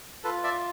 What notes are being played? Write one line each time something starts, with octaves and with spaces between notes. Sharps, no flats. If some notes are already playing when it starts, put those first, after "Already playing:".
F4 A4 B4
D5 E5